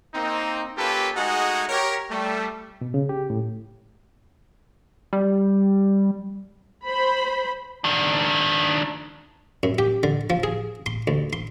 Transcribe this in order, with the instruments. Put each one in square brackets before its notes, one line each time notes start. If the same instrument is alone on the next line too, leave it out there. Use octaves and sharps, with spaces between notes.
[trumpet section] A#3 C4 D#4
A#3 C#4 F4 G4 A4 B4
G#3 A3 D#4 F#4 G#4 F#5
G4 A#4 C#5
G3 A3
[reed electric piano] B2
C#3
G4
A2
[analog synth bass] G3
[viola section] C5 B5
[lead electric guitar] D#3 D4
[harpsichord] F#2
G4
D3
F3
G#4
C6
D2
C6